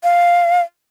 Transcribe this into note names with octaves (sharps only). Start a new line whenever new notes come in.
F5